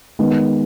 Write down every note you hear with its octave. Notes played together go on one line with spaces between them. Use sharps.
D#3 G#3 B3